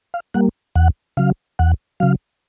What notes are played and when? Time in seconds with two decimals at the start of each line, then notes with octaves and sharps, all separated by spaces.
0.14 F5
0.34 G3 A#3 F#5
0.75 E2 F#5
1.17 C#3 F#3 F5
1.59 E2 F#5
2.00 C#3 F#3 F5